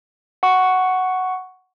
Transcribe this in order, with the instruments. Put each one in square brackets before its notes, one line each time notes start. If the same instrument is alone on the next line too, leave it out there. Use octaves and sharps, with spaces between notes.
[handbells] F#5 C#6